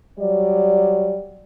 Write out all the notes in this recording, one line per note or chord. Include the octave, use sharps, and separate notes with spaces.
F#3 G3 D5